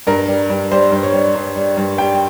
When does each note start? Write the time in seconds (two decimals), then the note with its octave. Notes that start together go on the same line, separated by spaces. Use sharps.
0.07 G2 A#4
0.28 G3
0.50 G2
0.71 G3 C5
0.92 G2
1.03 C#5
1.13 G3
1.35 G2
1.56 G3
1.77 G2
1.98 G3 G5